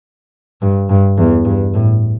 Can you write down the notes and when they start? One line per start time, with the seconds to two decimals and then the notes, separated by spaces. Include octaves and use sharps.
0.62 G2
0.90 G2
1.17 E2
1.45 G2
1.74 A2